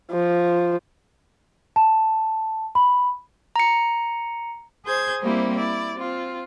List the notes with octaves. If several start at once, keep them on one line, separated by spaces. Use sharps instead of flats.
F3
A5
B5
A#5 C#7
G#4 C5 G6 G#6
G3 A#3 C4 E4 G4 C5
E4 D5
C4 F4